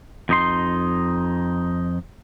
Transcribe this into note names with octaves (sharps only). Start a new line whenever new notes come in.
F2 D#4 C6